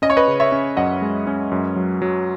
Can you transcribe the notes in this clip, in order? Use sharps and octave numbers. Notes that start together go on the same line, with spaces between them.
C#4 D#5
C#5
B4 D#5
C#3
C#5 E5
C#4
F#2 D#5 F#5
G#3
C#4
F#2
F#3
F#3